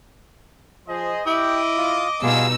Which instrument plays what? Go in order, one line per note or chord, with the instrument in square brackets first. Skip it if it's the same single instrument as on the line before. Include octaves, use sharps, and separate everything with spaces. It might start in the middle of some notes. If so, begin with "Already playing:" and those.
[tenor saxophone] F3 [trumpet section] G#4 C5 D#5
[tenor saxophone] E4 [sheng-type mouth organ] G4 G5 [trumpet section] D#5 D6
[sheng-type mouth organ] F4
[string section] B2 D#4 E6 [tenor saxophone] G3 [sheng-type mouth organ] F4 G#4